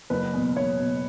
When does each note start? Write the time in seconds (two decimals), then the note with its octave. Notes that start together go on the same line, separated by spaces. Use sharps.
0.10 F#1 B4
0.33 E2 B2
0.56 F#1 C#5
0.79 E2 B2